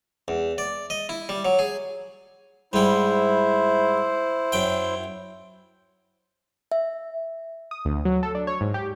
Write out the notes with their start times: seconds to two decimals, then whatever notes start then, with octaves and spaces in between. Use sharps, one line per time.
0.28 E2
0.58 D5
0.90 D#5
1.09 E4
1.29 G3
1.45 F#3
1.59 G#4
2.73 G#2 G3 E4 C5
4.52 F#2 G5
6.72 E5
7.71 D#6
7.85 D2
8.05 F#3
8.23 A4
8.35 D4
8.47 C#5
8.61 G#2
8.74 G4